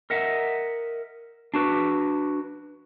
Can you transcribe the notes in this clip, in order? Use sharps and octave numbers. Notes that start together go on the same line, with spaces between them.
A#4 D#5 E5 F#5
D4 F#4 B4